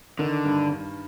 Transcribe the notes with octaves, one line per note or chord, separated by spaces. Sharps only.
D3 D#3
G2
G2